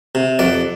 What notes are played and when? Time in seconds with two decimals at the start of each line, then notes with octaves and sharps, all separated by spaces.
0.15 C3
0.39 F2 D5